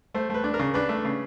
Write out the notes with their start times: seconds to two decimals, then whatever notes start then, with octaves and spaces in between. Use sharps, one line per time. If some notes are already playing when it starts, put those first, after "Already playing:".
0.14 A3 C5
0.30 A3 B4
0.44 D4
0.54 A#4
0.59 C#3
0.74 D4 B4
0.89 A3
1.05 C#3